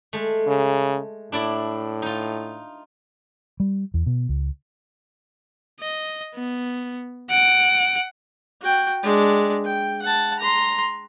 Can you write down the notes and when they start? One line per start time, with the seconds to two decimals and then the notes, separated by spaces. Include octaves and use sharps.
0.13 G#3 A3
0.47 C#3
1.32 A2 D4 E4 D5
2.02 D#4 F4
3.60 G3
3.94 E2
4.06 B2
4.29 C#2
5.80 D#5
6.35 B3
7.30 F#5 D7
8.62 F#4 G5
9.03 G#3 D4
9.65 G5
10.02 F#5 A5
10.39 A#5 C6